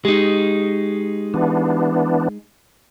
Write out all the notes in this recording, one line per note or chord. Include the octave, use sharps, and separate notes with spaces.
G#3 D#4 G4
E3 B3 D4